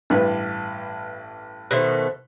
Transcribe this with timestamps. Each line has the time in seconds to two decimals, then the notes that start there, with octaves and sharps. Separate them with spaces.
0.10 A1 G2 D4 B4
1.71 B2 D#3 A3 C5 F#6